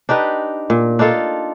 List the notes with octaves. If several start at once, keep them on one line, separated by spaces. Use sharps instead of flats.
D4 D#4 G4 B4
A#2
D4 D#4 F4 A4